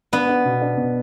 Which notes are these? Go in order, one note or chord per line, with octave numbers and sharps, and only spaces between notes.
B3 D4
D4
B2
D4
B2